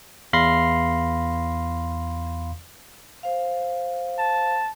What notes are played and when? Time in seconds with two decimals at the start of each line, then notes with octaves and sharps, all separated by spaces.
0.33 E2 F5 B5 C6 A#6 C7
3.23 C5 F5
4.18 A5